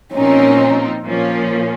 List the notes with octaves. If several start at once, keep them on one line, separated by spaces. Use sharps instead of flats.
A#2 F3 C4 C#4 D#4 A#4
A#2 F3 A#3 C#4